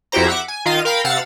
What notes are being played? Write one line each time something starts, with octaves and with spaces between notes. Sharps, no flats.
F2 E4 F#4 G4 C5 A#5
E5 F#5 D6
G#5
D#3 F4 D#5 F5 D#7
A#4 F5 G5 B5
C3 F5 F#5 E6 A6